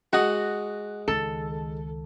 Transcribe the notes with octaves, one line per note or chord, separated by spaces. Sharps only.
G#3 F#4 F#5 D#6
C#2 D#3 A4